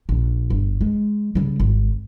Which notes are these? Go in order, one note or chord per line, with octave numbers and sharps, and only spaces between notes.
A#1
G1
G#3
C#3 G3
G#1